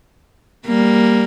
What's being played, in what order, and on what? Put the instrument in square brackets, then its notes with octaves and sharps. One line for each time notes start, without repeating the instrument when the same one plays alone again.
[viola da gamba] G3 A#3